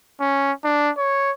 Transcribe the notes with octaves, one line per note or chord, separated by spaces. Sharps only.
C#4
D4
C#5